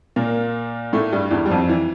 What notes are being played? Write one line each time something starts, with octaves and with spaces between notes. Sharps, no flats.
A#2 A#3
A2 A3
G2 G3
E2 E3
G3
F2 F3
E3